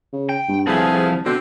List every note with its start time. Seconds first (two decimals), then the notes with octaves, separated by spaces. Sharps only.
0.13 C#3
0.29 G5
0.48 G2
0.67 C2 F3 A3 B3 G#4
1.25 B2 D3 C4